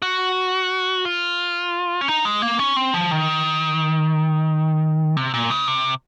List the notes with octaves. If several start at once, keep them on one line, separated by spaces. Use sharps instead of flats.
F#4
F4
C#4
D#4
G#3
A#3
C#4
C4
F3
D#3
C3
A#2
C#3
C3